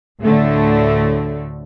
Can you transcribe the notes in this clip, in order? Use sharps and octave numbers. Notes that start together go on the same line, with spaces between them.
D2 A2 D3 A3